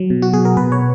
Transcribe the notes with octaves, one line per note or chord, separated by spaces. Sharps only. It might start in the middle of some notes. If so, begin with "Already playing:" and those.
Already playing: F#3
B2
F#4
B2 G#4
A#4
B2 B4
C#5